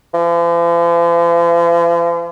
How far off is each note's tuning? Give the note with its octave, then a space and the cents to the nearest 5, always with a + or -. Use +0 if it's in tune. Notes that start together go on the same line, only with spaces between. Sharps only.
F3 -45